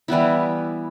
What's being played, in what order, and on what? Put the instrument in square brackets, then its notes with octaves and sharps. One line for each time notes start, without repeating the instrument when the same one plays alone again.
[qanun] E3 G3 B3 E4